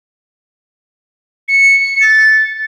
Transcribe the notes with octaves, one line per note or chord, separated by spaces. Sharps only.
C#7
A6